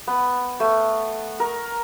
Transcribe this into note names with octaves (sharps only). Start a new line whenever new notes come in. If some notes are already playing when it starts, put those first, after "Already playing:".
B3
A3
A#4